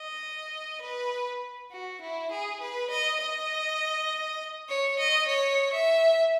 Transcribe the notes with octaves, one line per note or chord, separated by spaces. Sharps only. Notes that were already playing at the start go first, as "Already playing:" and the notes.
Already playing: D#5
B4
F#4
E4
G#4
B4
D#5
D#5
C#5
D#5
C#5
E5